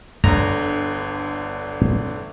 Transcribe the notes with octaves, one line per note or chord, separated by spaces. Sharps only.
G1 D3 A#5